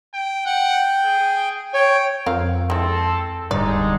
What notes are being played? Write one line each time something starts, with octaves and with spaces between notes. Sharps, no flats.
G5
F#5 G5
G#4
C#5 G5
F2 C4 A#4 F5
G#3 C4 E4 A4
D1 G2 D3 G3 G#3 D#4 D5